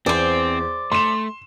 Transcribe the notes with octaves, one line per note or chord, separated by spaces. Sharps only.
E2 C4 C5 D5
A3 C6 E7